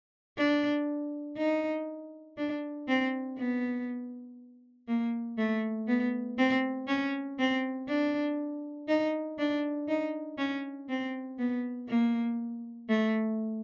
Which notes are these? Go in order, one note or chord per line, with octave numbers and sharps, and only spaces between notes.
D4
D#4
D4
C4
B3
A#3
A3
B3
C4
C#4
C4
D4
D#4
D4
D#4
C#4
C4
B3
A#3
A3